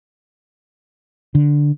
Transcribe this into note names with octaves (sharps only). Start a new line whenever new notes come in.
D3